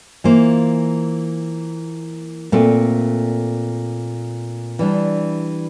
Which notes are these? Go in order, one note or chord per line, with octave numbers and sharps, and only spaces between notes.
E3 A#3 F4 C5
A#2 A3 C4
E3 G3 D4